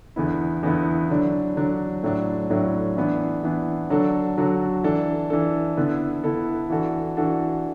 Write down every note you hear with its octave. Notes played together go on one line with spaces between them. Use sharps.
E2 D3 B3 E4
E2 D3 B3 E4
D3 F#3 D4
D3 F#3 D4
A2 F#3 D4
A2 F#3 D4
E3 B3 D4
E3 B3 D4
D3 F#3 D4 F#4 A4
D3 F#3 D4 F#4 A4
E3 D4 A4
E3 D4 A4
D3 B3 E4 A4
D3 B3 E4 A4
E3 D4 F#4 A4
E3 D4 F#4 A4